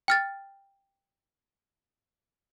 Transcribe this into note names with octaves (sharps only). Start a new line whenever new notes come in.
G5 F6 A6